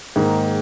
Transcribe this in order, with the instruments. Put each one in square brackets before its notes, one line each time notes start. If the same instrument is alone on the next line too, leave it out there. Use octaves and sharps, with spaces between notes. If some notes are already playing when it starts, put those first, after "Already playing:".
[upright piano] G#2 D#3 A#3